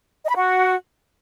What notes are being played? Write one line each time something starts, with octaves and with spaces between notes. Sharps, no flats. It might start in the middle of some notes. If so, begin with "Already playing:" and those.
D#5
B5
F#4